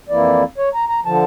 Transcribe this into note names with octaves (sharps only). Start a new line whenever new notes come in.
F2 E3 A#3 E4 D5
C#5
A#5
A#5
D3 F3 A5